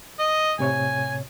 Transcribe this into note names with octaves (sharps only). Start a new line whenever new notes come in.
D#5
A2 C3 C#5 G#5